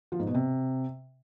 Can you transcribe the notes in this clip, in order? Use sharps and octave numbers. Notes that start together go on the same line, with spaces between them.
F3
G#2
B2
C3